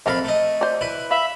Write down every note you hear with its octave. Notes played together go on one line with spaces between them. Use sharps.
F2 A4 A#4 E5 F5 B5
A3 D#5
C5 D5
E4 B4
E5 F5 B5